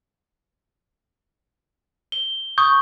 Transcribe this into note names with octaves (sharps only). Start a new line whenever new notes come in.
G7
C#6 D#6 G6